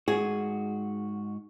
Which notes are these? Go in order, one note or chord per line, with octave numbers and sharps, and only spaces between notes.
G#2 F#4 G#4